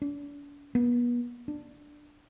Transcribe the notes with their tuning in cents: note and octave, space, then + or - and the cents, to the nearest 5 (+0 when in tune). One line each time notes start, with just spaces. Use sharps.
D4 -40
B3 -35
D4 +10